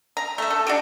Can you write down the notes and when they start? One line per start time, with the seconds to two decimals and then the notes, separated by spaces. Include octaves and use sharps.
0.17 A#5
0.38 A3 E5
0.50 A4
0.67 D4 F#4 G4